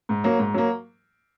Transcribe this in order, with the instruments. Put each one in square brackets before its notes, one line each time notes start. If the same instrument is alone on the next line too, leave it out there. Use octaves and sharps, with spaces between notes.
[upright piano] G#2
F#3 A#3
G#2
F#3 A#3